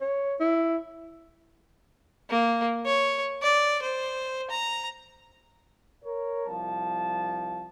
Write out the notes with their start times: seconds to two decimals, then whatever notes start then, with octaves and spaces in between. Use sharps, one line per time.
0.01 C#5
0.40 E4
2.30 A#3
2.86 C#5
3.42 D5
3.82 C5
4.50 A#5
6.04 A#4 C#5
6.47 C2 F3 A5